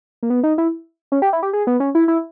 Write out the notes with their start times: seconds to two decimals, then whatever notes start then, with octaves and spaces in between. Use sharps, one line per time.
0.23 A#3
0.30 B3
0.43 D#4
0.58 E4
1.12 C#4
1.22 G4
1.33 E4
1.43 G4
1.53 G#4
1.67 B3
1.80 C#4
1.95 E4
2.08 E4